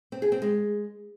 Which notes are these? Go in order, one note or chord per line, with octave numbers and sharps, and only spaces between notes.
C4
G#4
C4
G#3